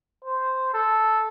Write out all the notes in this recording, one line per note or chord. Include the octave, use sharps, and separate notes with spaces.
C5
A4